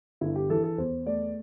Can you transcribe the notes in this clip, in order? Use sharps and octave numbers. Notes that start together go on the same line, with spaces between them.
G1 E4
G4
E3 A4
A4
E2 C5
A3 D5